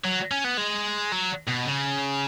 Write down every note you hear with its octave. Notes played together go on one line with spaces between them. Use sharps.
F#3
C#4
B3
G#3
F#3
B2
C#3